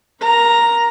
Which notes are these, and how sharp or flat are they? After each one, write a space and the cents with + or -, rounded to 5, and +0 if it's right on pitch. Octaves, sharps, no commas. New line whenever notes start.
A#4 +15 A#5 +0